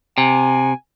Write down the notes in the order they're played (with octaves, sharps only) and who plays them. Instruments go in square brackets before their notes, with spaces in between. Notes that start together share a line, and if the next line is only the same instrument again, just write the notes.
[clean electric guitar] C3 [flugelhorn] G#5